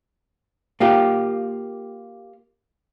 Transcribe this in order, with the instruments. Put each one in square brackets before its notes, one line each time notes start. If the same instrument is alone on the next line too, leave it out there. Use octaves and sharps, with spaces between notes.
[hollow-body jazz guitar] A#3 F4 G4